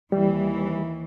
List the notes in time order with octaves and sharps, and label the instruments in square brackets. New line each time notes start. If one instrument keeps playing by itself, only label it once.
[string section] D#2 E3 [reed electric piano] G3